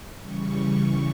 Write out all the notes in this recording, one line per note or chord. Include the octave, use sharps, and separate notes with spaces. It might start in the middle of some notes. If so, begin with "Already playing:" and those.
C#3 E3 G3 C#6